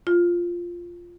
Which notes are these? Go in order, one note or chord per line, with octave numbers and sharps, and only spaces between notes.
F4